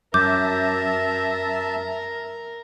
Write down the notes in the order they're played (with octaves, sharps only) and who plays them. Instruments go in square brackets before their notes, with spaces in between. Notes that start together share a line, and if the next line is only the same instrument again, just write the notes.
[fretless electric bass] F#2 [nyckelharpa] A#4 [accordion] E5 A5 [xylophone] D6 G6